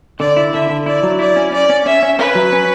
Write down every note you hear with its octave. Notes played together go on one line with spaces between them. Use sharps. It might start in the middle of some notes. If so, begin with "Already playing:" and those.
D3 D5
E4
D3 E5
D3
E4 D5
F#3
E4 D5
C#4
C#4 D5
C#4
C#4 E5
C#4
C#4 B4
F#3
C#4